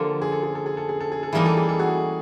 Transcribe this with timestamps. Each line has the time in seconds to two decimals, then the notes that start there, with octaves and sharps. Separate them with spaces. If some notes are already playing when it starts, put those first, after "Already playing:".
Already playing: D3 F3 A#3 G4 A4
0.22 G#4
0.32 A4
0.43 G#4
0.55 A4
0.66 G#4
0.77 A4
0.89 G#4
1.00 A4
1.12 G#4
1.23 A4
1.33 E3 G3 A#3 D#4 G#4
1.45 A4
1.57 G#4
1.69 A4
1.79 F#4 G#4